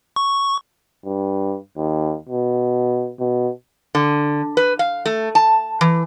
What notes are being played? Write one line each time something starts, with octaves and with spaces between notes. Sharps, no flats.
C#6
G2
D#2
B2
B2
D3
B4
F5
A3
A5
E3